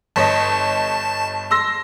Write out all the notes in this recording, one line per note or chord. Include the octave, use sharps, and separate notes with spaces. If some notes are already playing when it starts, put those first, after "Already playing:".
G1 C#5 D#5 A5
C6 E6 A#6